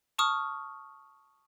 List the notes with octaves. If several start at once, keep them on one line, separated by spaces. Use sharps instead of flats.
A5 C#6 D#6 F6